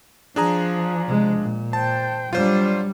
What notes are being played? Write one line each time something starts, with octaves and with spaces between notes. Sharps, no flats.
F3 D4 G#4 A#5
C3 G#3
A#2
C5 G5 A5
F#3 G3 D4 F4 C5